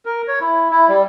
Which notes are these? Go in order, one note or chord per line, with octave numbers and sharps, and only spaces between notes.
A#4
C#5
E4
E4
G3